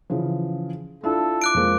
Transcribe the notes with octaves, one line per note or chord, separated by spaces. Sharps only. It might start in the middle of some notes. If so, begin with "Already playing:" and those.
C#3 E3 F3
D4 E4 F4 A4
D6 F#6 D7
F2 G#3 A#3